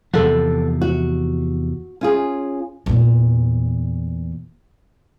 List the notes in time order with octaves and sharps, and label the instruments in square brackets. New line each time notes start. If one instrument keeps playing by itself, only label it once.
[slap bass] E2 C3 F3 [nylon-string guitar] A4 F#5
[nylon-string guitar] F#4
C#4 F4 G#4
[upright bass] E2 A#2